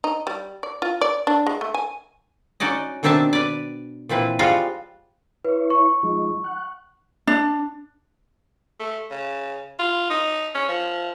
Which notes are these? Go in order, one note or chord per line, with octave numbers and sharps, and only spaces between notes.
D#4
G3
D5
F4
D5
D4
G#3
A3
G#5
C#4 D#4 F#4 D5 D#5
B2 D#3 C4 D4 E5 A5
B4 D5
A#2 E3 C4 B4
F3 G3 G#3 F4 F#4 F5
E4 B4 C#5
C#6
F3 G#3 D#4
F#5
D4
A3
C#3
F4
D#4
C#4
F3